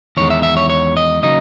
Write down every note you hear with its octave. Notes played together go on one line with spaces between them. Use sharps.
E2 D#3 G#3 C#5
E5
E5
C#5
C#5
D#5
C#3 F#3 A#3 D#4 D#5